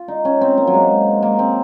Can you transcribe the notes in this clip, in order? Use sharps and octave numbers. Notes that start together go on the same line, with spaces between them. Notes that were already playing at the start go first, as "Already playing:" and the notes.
Already playing: F4
D#4
C#4
C4
A#3
F#3
G#3
A#3
C4